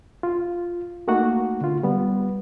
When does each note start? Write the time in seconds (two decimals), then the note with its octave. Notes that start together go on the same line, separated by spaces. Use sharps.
0.23 F4
1.08 A3 A#3 D#4 F#4 F#5
1.61 D3 F4
1.83 G3 B3